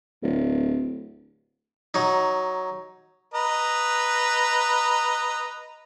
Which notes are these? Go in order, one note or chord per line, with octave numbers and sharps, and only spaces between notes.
D1
F#3 D#4
B4 D#5 A#5